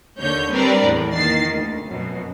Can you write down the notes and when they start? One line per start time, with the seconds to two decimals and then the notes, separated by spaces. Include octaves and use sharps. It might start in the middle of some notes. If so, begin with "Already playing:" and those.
0.18 D#2 D3 C#5 G6
0.52 G3 C4 D4 A#4 B4 D5
0.84 E2 A2
1.14 D#3 A#3 A6 C7
1.50 D2
1.86 F#2 B2